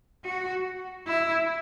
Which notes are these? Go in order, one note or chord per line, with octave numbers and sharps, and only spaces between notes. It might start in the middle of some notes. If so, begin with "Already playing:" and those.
F#4
E4